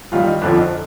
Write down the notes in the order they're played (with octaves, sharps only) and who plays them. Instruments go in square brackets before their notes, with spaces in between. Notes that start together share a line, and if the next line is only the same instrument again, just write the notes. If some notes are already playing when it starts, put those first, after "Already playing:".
[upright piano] G1 G2 D#3 G3 F4
D#4
G1 F2 D3 F3 D4
D#4